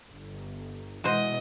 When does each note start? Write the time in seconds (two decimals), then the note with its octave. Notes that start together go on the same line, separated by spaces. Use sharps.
0.10 G1
1.04 B2 E3 G#3 F#4 C5 D#5